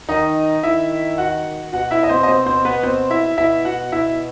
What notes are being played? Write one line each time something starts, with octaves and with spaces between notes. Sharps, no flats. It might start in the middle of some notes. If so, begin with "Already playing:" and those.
D#3 D#4 D#5
D#3 E4 E5
F#4 F#5
B2 F#4 F#5
E4 E5
D#5
C4 C5
D#5
B2 C4 C5
C4 C5
B3 B4
C4 C5
E4 E5
B2 E4 E5
F#4 F#5
B2 E4 E5